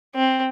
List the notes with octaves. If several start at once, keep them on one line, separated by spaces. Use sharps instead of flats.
C4